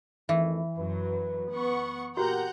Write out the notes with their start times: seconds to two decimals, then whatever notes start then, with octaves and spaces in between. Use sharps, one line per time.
0.29 F2 D#3 E3 A3 E5
0.78 F#2 F#3 B4
1.51 B3 F#5 C#6
2.17 A#2 F#4 G4 A#4 F#5 A#5 G6